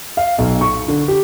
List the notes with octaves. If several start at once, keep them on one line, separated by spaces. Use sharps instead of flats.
F5
B1
C#6
D3
G4